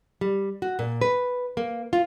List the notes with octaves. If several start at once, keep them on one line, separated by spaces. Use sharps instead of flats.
G3
F#4
A#2
B4
A#3
F4